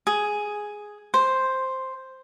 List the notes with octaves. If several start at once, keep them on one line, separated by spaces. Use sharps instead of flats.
G#4
C5